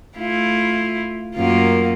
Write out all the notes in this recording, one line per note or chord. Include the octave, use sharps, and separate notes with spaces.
A3 E4 F4
F#2 A#3 F4